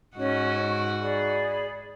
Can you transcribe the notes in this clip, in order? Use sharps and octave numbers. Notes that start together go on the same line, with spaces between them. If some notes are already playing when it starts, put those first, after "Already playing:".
G#2 C#4 F#4 D#5
C#6
G#4 D5 B5